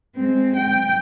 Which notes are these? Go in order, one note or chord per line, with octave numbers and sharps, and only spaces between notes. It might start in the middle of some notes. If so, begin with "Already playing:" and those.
G#3 C4
G5